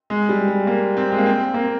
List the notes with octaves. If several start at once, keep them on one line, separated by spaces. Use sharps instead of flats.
G#3
G3
G3
A#3
C4
G#3
A#3
C4
A#3